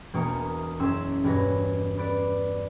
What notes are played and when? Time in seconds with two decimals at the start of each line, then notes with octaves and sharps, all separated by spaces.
0.13 E1 A#3 C#6 D#6
0.79 F#1 C#4 C6 E6 E7
1.23 E1 G2 B4 C#5 A#6
1.98 B4 D5 D7